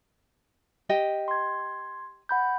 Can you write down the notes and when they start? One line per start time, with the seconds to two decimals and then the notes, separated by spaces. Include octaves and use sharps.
0.89 G4 D#5 G5
1.28 C6 G#6
2.29 F#5 B5 G6